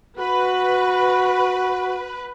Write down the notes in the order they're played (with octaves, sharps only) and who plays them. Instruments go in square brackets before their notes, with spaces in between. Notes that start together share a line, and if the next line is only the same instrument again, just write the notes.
[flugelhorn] F#4 [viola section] B4